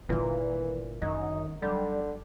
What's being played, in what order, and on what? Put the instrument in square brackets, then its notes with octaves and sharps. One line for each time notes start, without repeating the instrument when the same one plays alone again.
[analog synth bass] G1 [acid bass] A#2 [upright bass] D#3 F4 [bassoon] E3
[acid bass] F#2 [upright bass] D#3 [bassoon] D#4
[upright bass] G1 F#3 [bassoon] D3 [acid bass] G3